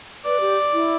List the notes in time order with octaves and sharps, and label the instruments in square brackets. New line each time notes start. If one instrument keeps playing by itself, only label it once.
[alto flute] B4 [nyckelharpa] D5
[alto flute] G4
E4